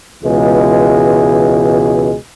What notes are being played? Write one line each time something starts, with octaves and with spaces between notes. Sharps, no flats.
C#2 B2 E3 G#3